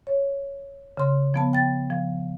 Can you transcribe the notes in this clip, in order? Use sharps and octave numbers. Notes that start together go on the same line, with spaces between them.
C#5
C#3 C6
F3 B3 A5
G5 A6
F3